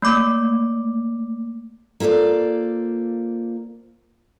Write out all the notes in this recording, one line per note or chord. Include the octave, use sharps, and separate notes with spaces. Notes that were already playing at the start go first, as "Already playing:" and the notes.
A3 A#3 D6
A#3 F4 A4 C5 D5